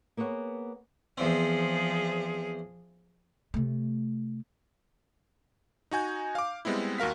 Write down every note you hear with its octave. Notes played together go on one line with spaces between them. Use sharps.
A#3 B3 G#4 C#5 F#5
E2 F3 C4 G#4
C3 A3
D#4 F#4 G#5 G6
F5 D6
G3 G#3 B3 C4 E4
D#2 F#4 A#4 F5 B6